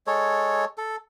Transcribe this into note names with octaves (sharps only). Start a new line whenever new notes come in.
G#3 A4 C#5
A4